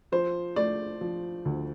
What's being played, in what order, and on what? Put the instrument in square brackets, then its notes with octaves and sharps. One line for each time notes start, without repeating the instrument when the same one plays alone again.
[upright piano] F3 C5
A3 D5
F3
D2